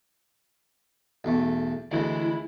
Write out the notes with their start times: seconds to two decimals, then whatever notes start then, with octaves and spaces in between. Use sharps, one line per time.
1.24 B1 E2 A3
1.92 D2 E3 G#3 E4